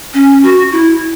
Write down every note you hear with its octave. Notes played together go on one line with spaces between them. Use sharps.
C#4
F#4
E4